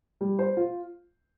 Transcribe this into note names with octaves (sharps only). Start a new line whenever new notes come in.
G3
C5
F4